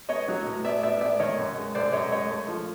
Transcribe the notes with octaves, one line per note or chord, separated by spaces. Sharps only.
B3 C#5 D#5
F#3
A2
B3 D5 E5
A2 D5 E5
B3 D5 E5
D#3 C#5 D#5
F#2
G#3
F#2 C5 D5
F#2 C#5 D#5
G#3 C#5 D#5
A3
F3